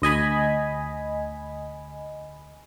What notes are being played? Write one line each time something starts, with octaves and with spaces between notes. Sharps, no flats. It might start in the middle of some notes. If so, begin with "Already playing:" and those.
D2 D#5 G#5 B5